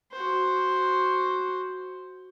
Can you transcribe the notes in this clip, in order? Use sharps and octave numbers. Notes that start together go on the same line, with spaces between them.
F#4 C5